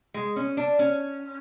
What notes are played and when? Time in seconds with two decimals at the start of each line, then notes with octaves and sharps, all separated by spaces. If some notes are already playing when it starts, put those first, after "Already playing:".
0.14 G#3
0.36 C#4
0.57 D4
0.79 C#4